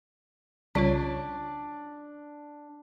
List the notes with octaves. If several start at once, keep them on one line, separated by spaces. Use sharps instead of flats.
C2 C#3 G3 C#4 D4 F4 C#5